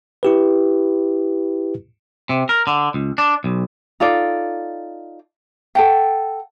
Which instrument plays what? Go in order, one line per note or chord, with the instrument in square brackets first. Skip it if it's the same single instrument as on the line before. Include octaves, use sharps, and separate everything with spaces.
[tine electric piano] E4 G4 B4
[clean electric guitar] C3
A#4
D3
C#2
D4
B1
[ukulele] D#4 F4 A4 D5
A4 F#5 G5